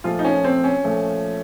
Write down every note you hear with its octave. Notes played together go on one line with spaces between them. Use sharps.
A#2 F3 A3 F4
D#4
C#4
C4
C#4
A#2 F3 A3